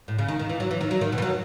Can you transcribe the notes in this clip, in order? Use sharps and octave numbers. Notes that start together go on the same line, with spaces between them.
A2
C#3
D#3
D#3
E3
F#3
E3
D#3
F#3
D#3
B2
E3
F#3